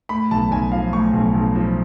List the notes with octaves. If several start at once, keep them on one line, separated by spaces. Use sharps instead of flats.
A2 B5
B1 A5
B1 G#5
F3 F5
A2 C#6
B1
B1
F3